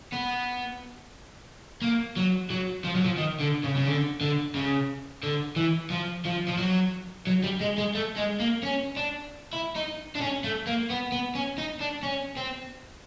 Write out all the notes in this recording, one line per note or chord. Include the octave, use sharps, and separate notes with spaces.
B3
A#3
F#3
F#3
F3
F#3
F3
D#3
D3
C#3
C#3
D3
D3
C#3
D3
E3
F3
F3
F3
F#3
F#3
G3
G#3
G#3
A3
G#3
A#3
C#4
D4
E4
D#4
D4
C#4
A3
A#3
B3
B3
C#4
D#4
D4
C#4
C4